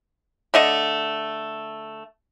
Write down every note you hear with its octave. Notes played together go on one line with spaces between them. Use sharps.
D3 A3 D#5